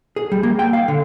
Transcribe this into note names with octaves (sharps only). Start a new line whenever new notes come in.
G#4
G3
A#3
G5
F5
D3